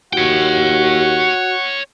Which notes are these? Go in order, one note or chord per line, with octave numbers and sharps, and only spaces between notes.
D#2 F#4 C#5 F#5 G5